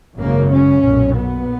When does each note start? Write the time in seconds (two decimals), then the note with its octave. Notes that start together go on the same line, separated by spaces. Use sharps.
0.18 G#1 F#2 C#3 A#3
0.51 C#4
0.82 B1 A#2
1.15 B3